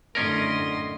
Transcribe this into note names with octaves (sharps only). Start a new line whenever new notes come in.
F#2 A2 D3 C#4 A#4 D#5 C6